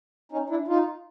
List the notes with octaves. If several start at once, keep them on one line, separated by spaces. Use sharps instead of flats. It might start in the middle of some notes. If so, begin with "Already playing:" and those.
C#4 D#4
D4 E4
D#4 F4